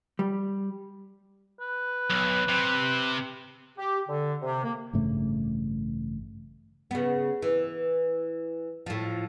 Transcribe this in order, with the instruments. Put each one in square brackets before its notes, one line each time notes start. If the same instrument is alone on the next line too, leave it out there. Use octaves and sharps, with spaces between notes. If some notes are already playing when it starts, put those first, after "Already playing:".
[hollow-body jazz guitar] G3
[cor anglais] B4
[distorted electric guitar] B1
C3
[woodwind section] G4
D3
C3
A#3
[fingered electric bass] A1 G2 C#3 A3
[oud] C#3 B3
E3
A2 F3